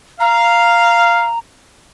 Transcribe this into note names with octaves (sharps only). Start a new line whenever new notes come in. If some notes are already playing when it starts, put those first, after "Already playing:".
F5 A#5